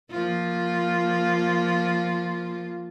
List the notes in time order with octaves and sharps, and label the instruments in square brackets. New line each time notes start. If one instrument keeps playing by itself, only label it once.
[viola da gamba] F3 A#3 F4